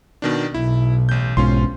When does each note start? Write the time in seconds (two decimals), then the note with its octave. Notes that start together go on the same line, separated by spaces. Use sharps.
0.22 B2 D#3 D4
0.54 B1 E4
1.09 A1 G6
1.37 B1 G#2 C#4 F4 C6